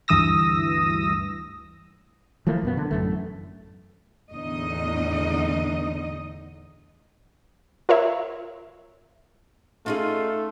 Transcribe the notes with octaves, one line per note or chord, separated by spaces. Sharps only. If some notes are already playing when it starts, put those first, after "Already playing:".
D2 G2 E3 D#6 E6 A#6
E3 F3 A3 A#3
F#2 B2 B3
D3
A1 F#2 A3
E2 A2 D3 D#4 D#5
F4 A#4 C#5 E5
A3 C#4 D#4 F4 G#4